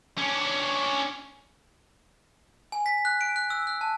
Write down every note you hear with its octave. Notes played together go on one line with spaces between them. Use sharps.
C#4 D4
G#5
B6
F#6
D7
F#6
E6
F#6
A5